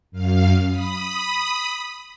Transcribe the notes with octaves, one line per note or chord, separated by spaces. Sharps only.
F#2 F5
B5 D#6